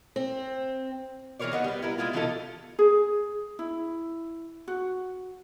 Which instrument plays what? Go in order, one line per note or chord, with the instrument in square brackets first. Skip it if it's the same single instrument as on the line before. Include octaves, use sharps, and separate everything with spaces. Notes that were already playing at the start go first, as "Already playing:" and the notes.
[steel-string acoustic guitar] C4
[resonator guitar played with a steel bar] E3 G#4 A#4 B4 C#5 D5
D#3 B3 D#5 F#5
G3 B3
E4 A#4 B4
G#3 B3 E4 F4
B2 E3 F3 D#4 F4 A4
[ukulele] G#4
E4
F#4